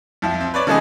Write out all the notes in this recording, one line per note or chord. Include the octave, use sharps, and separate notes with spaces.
F2 F3 E5
C4
B4 C#5 D5
C#3 F3 G#3 A3 D#4 G#4